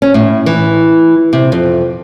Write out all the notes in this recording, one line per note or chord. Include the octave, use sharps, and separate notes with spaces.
C#4
A2
E3
C3
F2